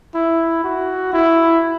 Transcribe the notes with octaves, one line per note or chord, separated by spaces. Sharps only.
E4
F#4
E4